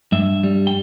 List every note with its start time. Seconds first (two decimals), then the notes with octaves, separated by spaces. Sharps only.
0.12 G2 E5
0.43 G3
0.67 G5